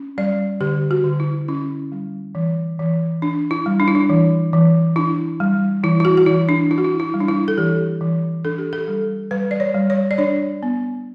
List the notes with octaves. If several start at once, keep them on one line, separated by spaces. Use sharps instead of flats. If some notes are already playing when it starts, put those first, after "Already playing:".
Already playing: C#4
G3 D5
D3 G4
F#4
D3
E4
C#4 E4
G3
E3
E3
D4
E4
G3
D4
E4
D4
E3
E3
D4 E4
G3
E3 E4
E4
F#4
F#4
E3 E4
D4
D4 E4
F#4
E4
E4
G3
D4
E4
A4
E3 G4
E3
D4 A4
G4
A4
G3
G3 B4
D5
C#5
G3
C#5
D5
D4 C#5
B3